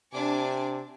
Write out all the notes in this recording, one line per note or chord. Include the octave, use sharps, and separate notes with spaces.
C3 D4 G#5 D6